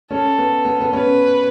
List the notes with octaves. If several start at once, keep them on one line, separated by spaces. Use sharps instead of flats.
C#4 A4
B3
B3
B3
C#4 B4